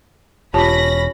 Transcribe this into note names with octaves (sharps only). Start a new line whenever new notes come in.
E1 C#4 F4 G4 A5 B5 A#6